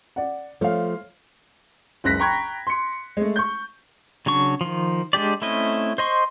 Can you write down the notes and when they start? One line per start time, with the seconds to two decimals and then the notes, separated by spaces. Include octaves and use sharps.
0.16 D5 F#5
0.61 F3 A3 C#5 F5
2.04 F#1 C#2 F#6 A#6 B6
2.20 G5 A#5 B5 C#6 F#6 G#6
2.67 C6 C#7
3.17 G#3 A3
3.36 C#6 G6
4.26 C#3 F#3 D4 C#6
4.61 D#3 F3
5.13 G#3 D4 G4 D5
5.42 A3 C4 C#4 E4 D#5
5.98 C5 D#5 C6 C#6